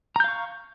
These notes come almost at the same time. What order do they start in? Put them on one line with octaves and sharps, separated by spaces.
A#5 G6 F5 C#6